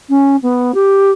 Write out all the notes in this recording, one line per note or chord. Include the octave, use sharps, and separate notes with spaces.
C#4
B3
G4